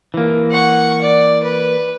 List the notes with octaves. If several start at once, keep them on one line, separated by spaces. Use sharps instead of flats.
E3 A#3
F#5 C#6
D5
B4